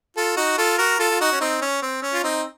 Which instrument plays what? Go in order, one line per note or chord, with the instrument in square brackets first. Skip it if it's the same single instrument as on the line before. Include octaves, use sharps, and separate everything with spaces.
[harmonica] F4 A4
D#4 F#4
F4 A4
F#4 A#4
F4 A4
F4
D#4 F#4
C#4
C4 D#4
C#4
C4
C#4
F4
C4 D#4